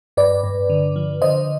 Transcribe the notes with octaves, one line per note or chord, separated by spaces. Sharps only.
G2 B4 D5
G2
D3
F3
D3 C5 D#5